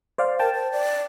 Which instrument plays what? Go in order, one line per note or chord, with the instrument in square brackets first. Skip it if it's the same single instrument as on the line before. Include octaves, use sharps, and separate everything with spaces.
[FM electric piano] C5 D5 F5
[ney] A#4 [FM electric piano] G5 A5
[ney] C5
D5